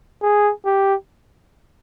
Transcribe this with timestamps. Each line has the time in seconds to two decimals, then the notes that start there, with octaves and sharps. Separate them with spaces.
0.22 G#4
0.65 G4